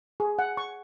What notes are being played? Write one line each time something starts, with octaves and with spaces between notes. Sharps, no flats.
G#4
F#5
C#6